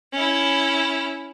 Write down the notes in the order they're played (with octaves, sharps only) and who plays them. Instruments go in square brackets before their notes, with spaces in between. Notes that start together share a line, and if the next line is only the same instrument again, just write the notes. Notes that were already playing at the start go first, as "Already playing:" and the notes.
[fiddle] C#4 E4